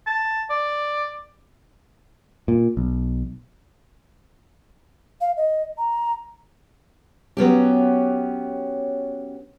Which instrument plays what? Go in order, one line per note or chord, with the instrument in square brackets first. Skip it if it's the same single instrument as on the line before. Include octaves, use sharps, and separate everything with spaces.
[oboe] A5
D5
[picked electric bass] A#2
B1
[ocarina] F5
D#5
A#5
[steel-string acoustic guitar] F#3 B3 C#4 G4